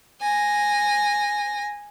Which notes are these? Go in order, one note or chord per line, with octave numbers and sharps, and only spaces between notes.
G#5 A#6